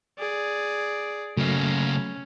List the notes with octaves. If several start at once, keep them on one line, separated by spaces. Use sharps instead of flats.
G#4 D5
C#3 F#3 A3 A#3 C#4